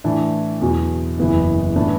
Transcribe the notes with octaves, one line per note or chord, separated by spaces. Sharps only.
A2 E3 D4
E2 B2 F#3
F#1 E2 E3 B3 E4
A2 E3 B3 D4